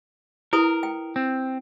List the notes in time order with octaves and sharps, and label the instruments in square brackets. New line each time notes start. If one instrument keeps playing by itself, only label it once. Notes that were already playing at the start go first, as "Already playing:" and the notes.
[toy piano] E4 B4 D#6 [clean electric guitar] A#4
[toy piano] G5
[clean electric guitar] C4